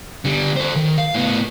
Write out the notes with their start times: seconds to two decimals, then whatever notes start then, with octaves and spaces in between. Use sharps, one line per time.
0.25 D3 G3
0.56 A4 C5
0.76 D#3
0.98 F5
1.15 A2 B3